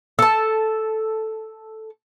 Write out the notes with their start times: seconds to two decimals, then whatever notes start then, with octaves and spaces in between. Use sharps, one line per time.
0.19 A4 A5